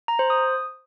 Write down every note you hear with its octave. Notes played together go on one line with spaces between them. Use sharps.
A#5
C5
D#6